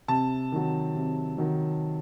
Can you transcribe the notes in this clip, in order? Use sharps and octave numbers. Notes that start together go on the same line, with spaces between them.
C3 A5
D#3 F#3
C3
D#3 F#3